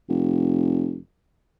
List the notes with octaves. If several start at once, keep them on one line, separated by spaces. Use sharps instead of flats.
F1